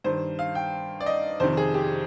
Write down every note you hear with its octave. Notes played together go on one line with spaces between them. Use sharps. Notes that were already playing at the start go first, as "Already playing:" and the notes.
G2 D#3 C5
F5
G5
D5
D#5
F2 C3 D#3 C5
G#4
G4